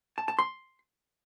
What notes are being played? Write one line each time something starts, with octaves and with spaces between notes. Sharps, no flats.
A5
A5
C6